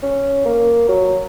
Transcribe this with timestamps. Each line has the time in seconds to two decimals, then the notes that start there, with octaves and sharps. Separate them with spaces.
0.03 C#4
0.45 A#3
0.89 F#3